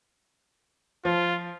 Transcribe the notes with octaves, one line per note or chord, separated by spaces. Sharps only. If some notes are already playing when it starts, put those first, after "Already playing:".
F3 F4